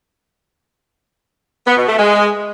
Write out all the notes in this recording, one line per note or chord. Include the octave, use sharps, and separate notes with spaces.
B3
B2
A3
G#3